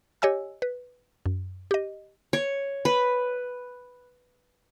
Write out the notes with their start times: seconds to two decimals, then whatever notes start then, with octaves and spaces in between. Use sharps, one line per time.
0.22 G4 C#5 D#5 G#5 E6
0.62 B4
1.26 F#2
1.71 G4 D#5
2.33 C#5
2.85 B4